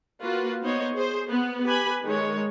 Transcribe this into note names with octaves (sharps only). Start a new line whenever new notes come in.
A#3 F4 F#4 B4
B3 D#4 C5 C#5 D#5
G#4 C5
B3
G4 B4 G#5 B5
D#3 G#3 C#5